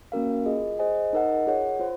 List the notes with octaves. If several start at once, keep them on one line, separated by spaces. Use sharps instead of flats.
A#3 C#4 F#4 A#4 F5
F4 G#4 D#5
G#4 C5 D#5 G#5
D#4 A#4 D#5 F#5
F4 G#4 C#5 F#5
F4 C5